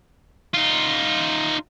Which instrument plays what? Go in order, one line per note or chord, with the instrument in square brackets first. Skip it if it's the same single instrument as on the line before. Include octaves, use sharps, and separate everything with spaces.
[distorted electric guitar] D#4 F4